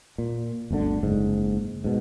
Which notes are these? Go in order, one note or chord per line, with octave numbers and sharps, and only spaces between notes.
A#2
G1 D2 B2 D3
F#1 G#2
G#2 B2